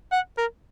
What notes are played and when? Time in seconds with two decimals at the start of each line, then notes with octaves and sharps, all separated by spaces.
0.12 F#5
0.38 A#4